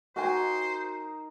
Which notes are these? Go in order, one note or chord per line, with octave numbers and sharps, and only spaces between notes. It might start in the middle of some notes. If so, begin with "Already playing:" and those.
D#4 F#4 A#4 C5 D#5 G#5